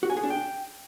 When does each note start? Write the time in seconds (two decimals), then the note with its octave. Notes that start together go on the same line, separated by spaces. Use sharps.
0.03 F#4
0.10 G#5
0.17 G#4
0.23 D4
0.30 G5